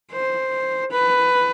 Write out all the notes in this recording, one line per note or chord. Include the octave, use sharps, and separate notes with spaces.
C5
B4